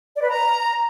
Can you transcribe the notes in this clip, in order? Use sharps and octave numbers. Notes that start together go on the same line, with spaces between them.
D5
B4
A#5